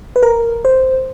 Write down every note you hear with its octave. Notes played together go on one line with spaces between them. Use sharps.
B4
A#4
C5